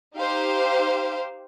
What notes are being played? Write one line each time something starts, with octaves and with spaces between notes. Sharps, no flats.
D#4 G4 C5 F5